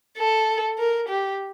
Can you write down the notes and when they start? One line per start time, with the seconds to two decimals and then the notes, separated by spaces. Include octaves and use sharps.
0.18 A4
0.79 A#4
1.09 G4